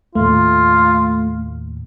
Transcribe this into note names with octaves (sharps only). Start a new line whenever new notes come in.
D#2 A2 A3 F4